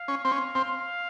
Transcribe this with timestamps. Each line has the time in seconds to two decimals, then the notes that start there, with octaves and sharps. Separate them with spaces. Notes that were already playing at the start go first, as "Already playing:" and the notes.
Already playing: F5
0.08 C#4
0.25 C4
0.32 C#4
0.55 C4